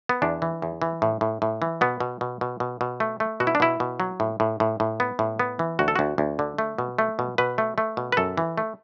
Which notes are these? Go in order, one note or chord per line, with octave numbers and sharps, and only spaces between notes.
B3
E2 D4
E3
E2
E3
A2
A2
A2
E3
B2 B3
B2
B2
B2
B2
B2
A3
A3
B2 F#4
E4
D4
B2 E4
B2
F#3
A2
A2
A2
A2
B3
A2
B3
E3
D2 F#4
A4
D2 F#4
D2
D3
A3
B2
A3
B2
B2 B4
A3
A3
B2
B4
F#2 A4
E3
A3